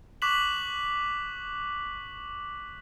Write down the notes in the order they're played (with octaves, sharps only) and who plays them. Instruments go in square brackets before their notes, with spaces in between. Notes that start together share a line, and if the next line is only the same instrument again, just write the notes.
[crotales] C#6 D6 F#6 B6 E7 F#7